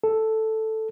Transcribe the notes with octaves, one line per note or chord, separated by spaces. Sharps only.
A4